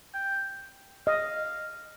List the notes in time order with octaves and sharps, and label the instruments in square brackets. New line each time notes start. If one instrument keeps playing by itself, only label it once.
[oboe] G5
[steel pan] D#5 [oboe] F5